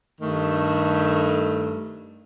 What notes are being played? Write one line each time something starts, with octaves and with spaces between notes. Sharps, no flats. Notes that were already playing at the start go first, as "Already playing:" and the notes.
G2 D#3 A3